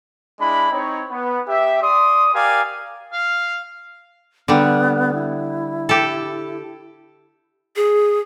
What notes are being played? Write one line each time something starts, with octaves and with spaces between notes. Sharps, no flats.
G#3 D4 E4 B5
C4 D#4 C#5
B3
G4 E5
D5 C6 D#6
G4 A#4 D5 F5 G#5
F5
D3 G3 B3
E4
G4 A4
G#4